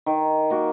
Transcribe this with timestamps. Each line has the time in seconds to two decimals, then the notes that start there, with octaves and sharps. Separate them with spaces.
0.06 D#3
0.50 A#3 F#4